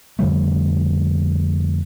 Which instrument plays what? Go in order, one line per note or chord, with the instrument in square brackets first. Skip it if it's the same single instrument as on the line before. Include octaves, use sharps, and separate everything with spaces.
[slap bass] F2 D3 G3 A3